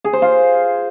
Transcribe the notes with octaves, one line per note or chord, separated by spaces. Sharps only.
G#4
C5
F4